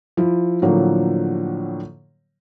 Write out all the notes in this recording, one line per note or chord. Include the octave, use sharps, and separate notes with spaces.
F3 E4
A2 D3 F3 F#3 A#3